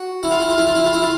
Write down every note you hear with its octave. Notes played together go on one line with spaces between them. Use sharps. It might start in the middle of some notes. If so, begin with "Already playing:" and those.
Already playing: F#4
E4
F4
E4
F4
E4
F4
E4
F4
E4
F4